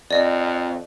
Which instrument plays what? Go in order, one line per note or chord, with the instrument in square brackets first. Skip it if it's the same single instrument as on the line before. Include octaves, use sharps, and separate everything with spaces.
[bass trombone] F2 [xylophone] D5 D#5